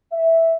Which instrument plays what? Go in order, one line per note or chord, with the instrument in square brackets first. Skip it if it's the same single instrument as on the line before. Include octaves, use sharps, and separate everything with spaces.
[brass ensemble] E5